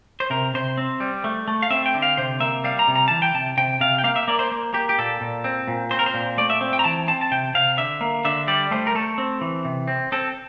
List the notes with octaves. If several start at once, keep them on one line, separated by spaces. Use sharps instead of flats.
C5
C3 A#4
C3 C5
C4
G3
A3
A3
F5
C4 E5
G5
D3
F5
C3 C5
A#3 E5
G3 F5
A#5
C3
A#5
E3 A5
G5
C3 A5
C3 G5
C3 F5
G5
A#3 F5
E5
A#3 D5
C5
A#3
A#3 G4
G4
A#2 A4
A#2
C4
A#2
C4 C5
A#4
C5
A#2
A3 D5
E5
C4
G5
A#5
E3 A5
C4 A5
A5
C3 G5
C3 F5
D3 E5
A#3
D3 E5
G3 D5
A3 C5
A#4
A3 A4
C4
E3
C3
C4
C4 A4